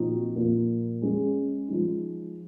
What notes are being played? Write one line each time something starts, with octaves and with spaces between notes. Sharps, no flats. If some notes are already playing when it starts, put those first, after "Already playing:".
Already playing: A#2 F3 C4 D#4 F#4
A#2 F3 A#3
G#3 C#4 G#4
F3 G#3 D#4